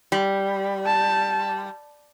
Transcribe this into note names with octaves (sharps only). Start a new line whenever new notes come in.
G3
A5